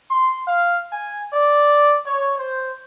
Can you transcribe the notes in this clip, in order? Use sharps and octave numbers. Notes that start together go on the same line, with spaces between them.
C6
F5
G#5
D5
C#5
C5